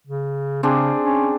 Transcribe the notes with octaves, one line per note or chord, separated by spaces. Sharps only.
C#3
C#3 C4 D4 G#4
C#4